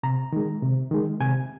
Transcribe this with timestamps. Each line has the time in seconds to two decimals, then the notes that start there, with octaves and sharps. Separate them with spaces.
0.03 C3 A#5
0.32 D#3 G#3
0.62 C3
0.91 D#3 G#3
1.21 C3 G#5